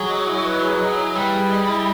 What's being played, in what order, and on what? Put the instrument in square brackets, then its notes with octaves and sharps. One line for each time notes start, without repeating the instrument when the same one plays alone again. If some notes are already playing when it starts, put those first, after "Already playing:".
Already playing: [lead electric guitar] F#3 [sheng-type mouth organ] G#4
[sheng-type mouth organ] D#5
E4
B4
G#4
D#5
E4
[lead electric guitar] G3 [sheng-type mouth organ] B4
[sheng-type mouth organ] G#4
D#5
E4